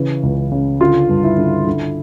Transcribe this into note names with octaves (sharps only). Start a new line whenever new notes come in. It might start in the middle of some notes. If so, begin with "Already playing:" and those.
Already playing: C#3 E3
C#2
C#3
D3 F4
G2
E4
D3
D3